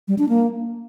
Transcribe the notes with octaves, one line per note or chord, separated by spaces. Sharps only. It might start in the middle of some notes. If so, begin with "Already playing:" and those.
G3
D4
A#3